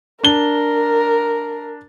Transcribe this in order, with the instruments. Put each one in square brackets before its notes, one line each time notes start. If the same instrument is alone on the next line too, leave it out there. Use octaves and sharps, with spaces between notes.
[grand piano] D4 G7 [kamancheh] A#4